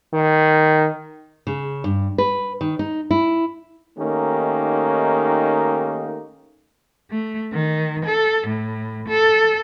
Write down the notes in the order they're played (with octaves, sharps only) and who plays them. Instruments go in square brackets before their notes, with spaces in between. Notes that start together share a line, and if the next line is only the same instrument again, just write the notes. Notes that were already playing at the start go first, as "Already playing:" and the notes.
[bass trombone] D#3
[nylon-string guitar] C#3
G2
B4
D#3
D#4
E4
[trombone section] D#3 A3 A#3 C#4 D#4 G4
[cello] A3
D#3
A4
A2
A4